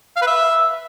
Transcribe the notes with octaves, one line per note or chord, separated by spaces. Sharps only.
F5
B4
E5